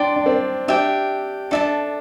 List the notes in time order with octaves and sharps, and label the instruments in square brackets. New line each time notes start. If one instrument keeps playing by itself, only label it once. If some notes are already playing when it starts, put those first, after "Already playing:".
Already playing: [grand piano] D4 [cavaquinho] D5 G5 C6
[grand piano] D4
C4
[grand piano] D4 [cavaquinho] G4 E5 G5
[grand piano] D4 [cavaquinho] A4 E5 A5